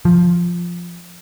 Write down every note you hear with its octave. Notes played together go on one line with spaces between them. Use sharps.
F3